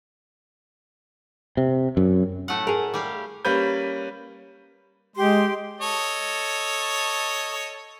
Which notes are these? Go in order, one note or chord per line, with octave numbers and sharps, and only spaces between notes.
C3
F#2
A2 A3 F#5
G#4 A#4
G3 G4 F5
G3 A#3 C#4 B4 B5 G6
G#3 G4 C6
A4 C#5 D#5